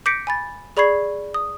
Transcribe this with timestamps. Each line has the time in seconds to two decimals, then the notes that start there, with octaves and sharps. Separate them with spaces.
0.06 D6 G6 A#6 B6 C#7 D7
0.27 G#5 B5 A6
0.77 G#4 D5 B5 C#6 G#6 C7
1.34 D#6